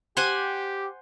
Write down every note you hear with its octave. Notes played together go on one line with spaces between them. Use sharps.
G4 C5 F#5 G#5